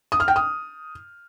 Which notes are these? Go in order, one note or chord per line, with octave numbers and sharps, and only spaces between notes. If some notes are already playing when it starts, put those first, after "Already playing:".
D#6
F6
G5
D#6